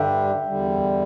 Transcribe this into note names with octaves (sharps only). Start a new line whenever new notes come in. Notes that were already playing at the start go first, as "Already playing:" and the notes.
Already playing: G2 D3 G3 D4 E5 G5
E2 D3 G3